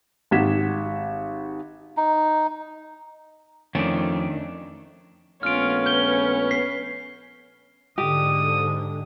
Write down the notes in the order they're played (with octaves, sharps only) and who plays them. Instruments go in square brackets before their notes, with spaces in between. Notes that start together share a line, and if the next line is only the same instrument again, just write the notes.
[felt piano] G#1 G4 F#5 G#6 B6 E7
[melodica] D#4
[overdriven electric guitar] F2 [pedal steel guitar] D#3 [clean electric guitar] A3 D4 [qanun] C#4
[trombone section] A#1 A3 B3 [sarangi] C#4 [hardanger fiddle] F4 [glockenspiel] F6 D7
[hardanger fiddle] B4 [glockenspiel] G6 G7
[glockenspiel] B6 C7
[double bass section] G#2 D3 [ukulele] G4 [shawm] D#6